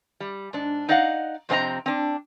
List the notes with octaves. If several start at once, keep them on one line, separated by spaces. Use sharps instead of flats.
G3
G#2 D4
D#4 D5 D#5 F5 F#5
F2 C3 C4 D4 D#5 A#5
C4 D4